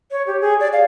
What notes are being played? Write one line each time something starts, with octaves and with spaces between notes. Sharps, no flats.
C#5
G4
G#4
D5
F5